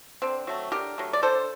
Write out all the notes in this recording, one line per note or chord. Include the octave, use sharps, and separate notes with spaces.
D3 C4
F#3 A3
D3 G4 A#4
F#3 A3
D5
D3 A4 C5